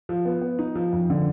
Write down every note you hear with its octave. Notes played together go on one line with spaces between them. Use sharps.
F3
B3
B3
D#4
F3
F2
D3